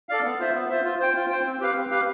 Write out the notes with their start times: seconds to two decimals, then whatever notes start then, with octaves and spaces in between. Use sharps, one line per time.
0.09 A4 D5 F5
0.24 B3
0.40 F4 C5 E5
0.54 B3
0.69 F4 C5 E5
0.85 F4
1.00 C5 G5
1.16 F4
1.30 C5 G5
1.46 C4
1.61 G4 B4 F5
1.76 C4
1.90 G4 B4 F5